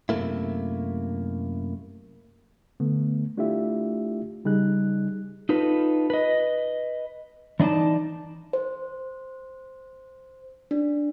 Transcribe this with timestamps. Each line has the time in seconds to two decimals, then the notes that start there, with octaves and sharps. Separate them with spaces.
0.09 F#2 C3 D#3 A3 A#3 E4
2.80 D3 A3 B3
3.37 A3 D4 E4 F4 G4 E5
4.45 C#3 G3 D#4 G#4 F#6
5.49 D#4 F4 A4 B4
6.10 B4 D#5
7.60 E3 D4 D#4 D5 A5
8.53 C5
10.71 D4